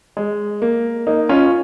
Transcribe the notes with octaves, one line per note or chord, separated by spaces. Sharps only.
G#3
A#3
A#3 D#4
C#4 F4